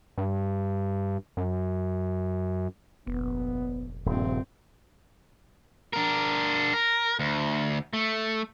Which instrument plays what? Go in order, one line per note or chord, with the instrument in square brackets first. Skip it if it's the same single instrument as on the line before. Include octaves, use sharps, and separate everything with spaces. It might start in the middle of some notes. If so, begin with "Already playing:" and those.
[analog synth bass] G2
F#2
[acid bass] F1 [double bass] A#1 [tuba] B3
[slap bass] D#1 [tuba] A#1 [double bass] G2 C4
[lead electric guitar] D4 A#4
A#4
D2
A3